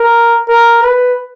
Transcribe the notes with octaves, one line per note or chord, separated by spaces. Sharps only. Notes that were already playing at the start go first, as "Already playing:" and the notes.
Already playing: A#4
A#4
B4